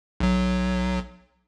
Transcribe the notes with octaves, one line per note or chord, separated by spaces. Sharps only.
B1 F#3